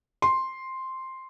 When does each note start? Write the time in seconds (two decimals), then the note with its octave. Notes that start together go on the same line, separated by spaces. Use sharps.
0.22 C6